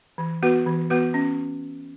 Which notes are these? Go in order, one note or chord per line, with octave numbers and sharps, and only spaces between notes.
E3
B3 F#4 B4
E3
B3 F#4 B4
C#4